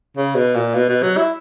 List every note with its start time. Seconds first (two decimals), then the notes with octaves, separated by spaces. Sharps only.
0.17 C#3
0.35 B2
0.55 A#2
0.74 B2
0.89 B2
1.03 F#3
1.17 E4